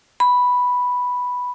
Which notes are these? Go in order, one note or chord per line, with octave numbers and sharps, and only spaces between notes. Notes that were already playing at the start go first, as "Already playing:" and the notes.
B5